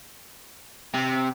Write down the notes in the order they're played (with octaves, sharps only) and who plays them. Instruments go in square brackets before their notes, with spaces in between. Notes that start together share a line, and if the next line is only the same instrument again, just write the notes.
[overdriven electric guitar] C3